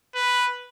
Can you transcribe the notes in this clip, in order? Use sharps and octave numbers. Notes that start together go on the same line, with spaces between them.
B4